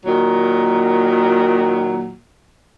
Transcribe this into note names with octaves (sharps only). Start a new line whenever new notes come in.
A#2 D#3 F#3